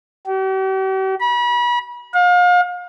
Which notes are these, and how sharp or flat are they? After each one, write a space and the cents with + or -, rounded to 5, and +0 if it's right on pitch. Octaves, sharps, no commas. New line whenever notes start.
G4 -45
B5 -35
F5 +35